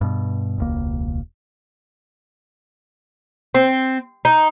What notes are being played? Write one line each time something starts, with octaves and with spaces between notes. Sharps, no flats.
G2 B2
E1 C#2 A#3
C4
D#4